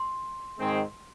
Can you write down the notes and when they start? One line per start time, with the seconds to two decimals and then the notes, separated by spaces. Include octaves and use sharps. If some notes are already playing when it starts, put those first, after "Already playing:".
Already playing: C6
0.58 G#2 D#3 G#3 C4